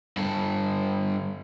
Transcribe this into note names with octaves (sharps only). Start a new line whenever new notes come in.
G2 A4